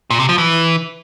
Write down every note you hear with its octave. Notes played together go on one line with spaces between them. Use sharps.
A#2
C3
F3
E3